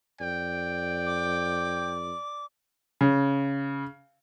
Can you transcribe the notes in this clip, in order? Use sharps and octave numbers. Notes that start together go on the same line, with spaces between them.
F2 D5 G5
D6
C#3